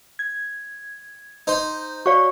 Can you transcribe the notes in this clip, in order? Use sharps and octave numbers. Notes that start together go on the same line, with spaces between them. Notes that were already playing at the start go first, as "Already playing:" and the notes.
G#6
D#4 C5
F#4 C#5 D5 F5 C#6